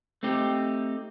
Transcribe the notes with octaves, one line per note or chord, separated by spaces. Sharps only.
A3 C4 D#4 G4